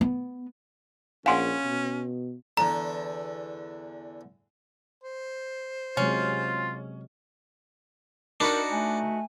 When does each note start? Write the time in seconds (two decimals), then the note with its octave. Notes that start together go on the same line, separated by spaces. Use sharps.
0.01 B3
1.26 A#1 C#4 F5 F#5 G#5 C6
1.65 B2
2.57 E2 D3 A#5
5.04 C5
5.97 C3 F#3 G#3 C#4 F4
8.40 D4 D#4 F#4 A#4 B4
8.71 A3 G#5